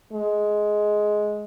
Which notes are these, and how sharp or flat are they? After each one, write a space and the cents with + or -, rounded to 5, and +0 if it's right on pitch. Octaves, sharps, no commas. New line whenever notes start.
G#3 +10